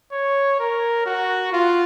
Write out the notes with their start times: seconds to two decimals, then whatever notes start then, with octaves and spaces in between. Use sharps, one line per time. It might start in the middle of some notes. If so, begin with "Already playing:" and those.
0.12 C#5
0.59 A#4
1.06 F#4
1.53 F4